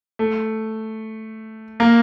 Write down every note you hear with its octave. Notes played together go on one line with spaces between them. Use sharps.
A3
A#3